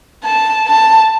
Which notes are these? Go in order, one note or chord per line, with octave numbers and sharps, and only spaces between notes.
A5
A5